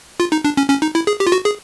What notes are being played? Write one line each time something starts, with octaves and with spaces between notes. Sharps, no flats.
F4
D#4
D4
C#4
C#4
D#4
E4
G#4
G4
F4
F#4
G#4